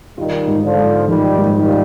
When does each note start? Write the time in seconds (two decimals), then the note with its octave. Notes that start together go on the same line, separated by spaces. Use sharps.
0.17 D#3 G3 F4
0.47 G#2
0.62 D3 F3
0.77 G#2
1.08 D#3 F3 G3
1.38 G#2
1.53 D#3 G3
1.68 F4